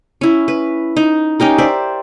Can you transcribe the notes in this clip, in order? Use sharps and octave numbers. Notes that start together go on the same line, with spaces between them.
C#4 E4
B4
D#4
C#4 D#4 G4 A#4
C5 D5 E5